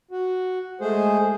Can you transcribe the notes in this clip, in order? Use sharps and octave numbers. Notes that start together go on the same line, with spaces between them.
F#4
G#3 A3 G#4 C5